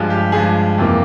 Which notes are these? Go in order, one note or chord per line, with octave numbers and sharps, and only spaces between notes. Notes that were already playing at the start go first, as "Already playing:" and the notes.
Already playing: G2 F3 G#3
G4
G2 F3 G#3 G#4
F2 C3 E3 A#3